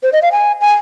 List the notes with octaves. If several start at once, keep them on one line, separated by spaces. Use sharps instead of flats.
C5
D#5
F5
G#5
G#5